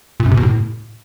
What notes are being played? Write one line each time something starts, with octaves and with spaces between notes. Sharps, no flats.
A#2
F#2
C3
B2
A2